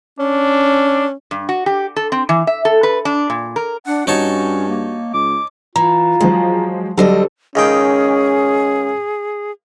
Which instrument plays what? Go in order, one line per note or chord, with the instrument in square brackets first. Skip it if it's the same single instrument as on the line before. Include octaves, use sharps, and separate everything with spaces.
[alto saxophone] C#4 [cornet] D4
[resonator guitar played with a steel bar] G2
F#4
G4
A4
C4
E3
E5
A4
B4
D4
A#2
A#4
[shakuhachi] D4 [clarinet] F#5
[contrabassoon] G2 [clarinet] C#4 [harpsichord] D#4 C#5 A5 [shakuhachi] F#4
[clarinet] A#3
[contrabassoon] C#2 [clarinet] D6
[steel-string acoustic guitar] E3 [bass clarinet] F4 [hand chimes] A#5
[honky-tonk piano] F3 G#3 [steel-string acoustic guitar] F#3
[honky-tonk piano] D3 A4 C5 [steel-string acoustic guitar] F#3 G3 D#5 [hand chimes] G4
[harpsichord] C#2 D#3 G5 [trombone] C#4 [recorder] G#4